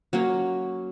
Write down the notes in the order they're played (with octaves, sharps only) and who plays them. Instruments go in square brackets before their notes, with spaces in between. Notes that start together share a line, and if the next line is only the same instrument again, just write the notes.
[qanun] F#3 A#3 C#4